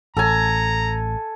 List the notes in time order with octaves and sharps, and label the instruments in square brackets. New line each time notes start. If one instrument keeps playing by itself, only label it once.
[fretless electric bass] A1 [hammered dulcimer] A4 G#5 [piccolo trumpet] A#5